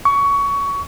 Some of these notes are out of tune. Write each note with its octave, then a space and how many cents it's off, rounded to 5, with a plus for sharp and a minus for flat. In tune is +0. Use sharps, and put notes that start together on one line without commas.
C#6 +20